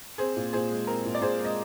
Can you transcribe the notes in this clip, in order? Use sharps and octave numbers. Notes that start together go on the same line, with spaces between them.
C4 G#4 C5
A#2
A#2 G#4 C5
G#3
C4 A#4
A#2
D5
A#2 G#4 C5
G#3
D#5